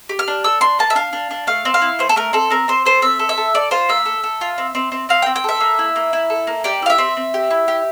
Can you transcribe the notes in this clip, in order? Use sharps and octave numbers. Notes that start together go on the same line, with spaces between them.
G4
F6
D4
A4 E6
D4 C6
A#3 A5
E5
D4 F5
D4
D4
A3 F5
C4
F5
E4
A3 C5
A4
A3 A#4
C4 A4
C4 A#4
C4 C5
A4 C5
C4 E5
A4
E5
A4
A4 D5
F4 C5
A#3 E5
A4
A4
F4
C4
C4
C4
C4 F5
C4 G5
G5
A4 E5
A#3
E4
A#3
E4
A4
A#3
G4 D5
E4 F5
E5
C4
C4
G4
E4
G4